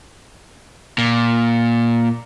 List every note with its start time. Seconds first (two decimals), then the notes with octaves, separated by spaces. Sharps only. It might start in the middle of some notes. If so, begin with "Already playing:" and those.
0.98 A#2